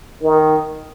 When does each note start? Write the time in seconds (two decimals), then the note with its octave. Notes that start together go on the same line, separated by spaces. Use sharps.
0.23 D#3